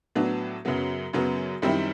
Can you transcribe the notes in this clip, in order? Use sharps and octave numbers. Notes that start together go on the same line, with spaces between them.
A2 F#3 B3 D4
F#2 C#3 F#3 B3
F#2 C#3 F#3 B3
F#2 D#3 G3 C4 E4